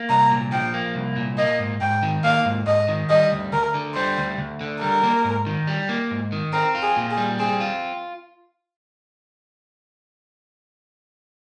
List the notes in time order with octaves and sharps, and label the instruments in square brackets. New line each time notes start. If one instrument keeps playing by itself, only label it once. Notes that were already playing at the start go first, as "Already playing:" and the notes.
Already playing: [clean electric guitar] A#3
[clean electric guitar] C2 [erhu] A#5
[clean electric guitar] A#2
[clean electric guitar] F3 [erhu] G5
[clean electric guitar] A#3
C2
A#2
[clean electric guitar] A#3 [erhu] D#5
[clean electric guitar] G#2
[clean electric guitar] G#2 [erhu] G5
[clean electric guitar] D#3
[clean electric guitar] A#3 [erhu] F5
[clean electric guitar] G#2
[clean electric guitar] G#2 [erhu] D#5
[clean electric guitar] D#3
[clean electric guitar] G3 [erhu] D#5
[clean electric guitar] D2
[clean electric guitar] D2 [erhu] A#4
[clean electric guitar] D3
[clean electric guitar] G3 [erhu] C5
[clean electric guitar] D2
D2
D3
[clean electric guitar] G3 [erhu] A#4
[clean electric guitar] A#3
G#2
D#3
G3
A#3
G#2
D#3
[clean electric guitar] C4 [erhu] A#4
[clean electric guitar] F4
[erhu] G#4
[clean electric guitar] A#2
[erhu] G#4
[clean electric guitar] G3
[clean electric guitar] C4 [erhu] G#4
[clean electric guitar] F4